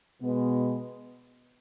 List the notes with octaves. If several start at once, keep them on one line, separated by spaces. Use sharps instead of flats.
B2 G#3 B3